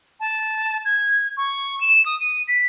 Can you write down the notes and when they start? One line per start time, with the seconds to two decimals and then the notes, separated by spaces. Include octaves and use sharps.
0.20 A5
0.85 G#6
1.37 C#6
1.81 E7
2.06 D#6
2.21 D#7
2.48 B6